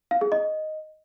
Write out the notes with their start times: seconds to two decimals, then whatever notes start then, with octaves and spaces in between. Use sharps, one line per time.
0.11 F5
0.21 G#4
0.32 D#5